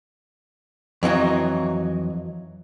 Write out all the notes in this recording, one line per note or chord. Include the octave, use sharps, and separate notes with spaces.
F2 E3 F#3 D#4